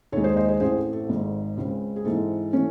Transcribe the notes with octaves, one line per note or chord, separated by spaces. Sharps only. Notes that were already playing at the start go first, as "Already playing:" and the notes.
D#2 D#3 G#3 A4 C#5
G#4 C5
C5 D#5
G#4 C5
A1 A2 E3 C4 G#4 C5
A4
A4
G#1 G#2 D#3
C#2 C#3 G#3 C4
G#4
G#2 E3 G#3 C4 A4
E3 A3 C#4